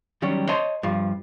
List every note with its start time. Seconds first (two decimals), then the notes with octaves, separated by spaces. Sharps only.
0.22 D#3 F#3 G3 C#4
0.49 C5 C#5 D#5 A5 C6
0.83 G2 F3